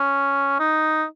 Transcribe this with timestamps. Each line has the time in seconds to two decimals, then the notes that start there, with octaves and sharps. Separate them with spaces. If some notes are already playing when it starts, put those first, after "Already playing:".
Already playing: C#4
0.59 D#4